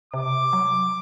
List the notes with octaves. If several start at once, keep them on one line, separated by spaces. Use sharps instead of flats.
C3 D6
F#3